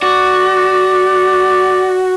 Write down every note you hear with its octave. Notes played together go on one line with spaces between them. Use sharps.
F#4 D5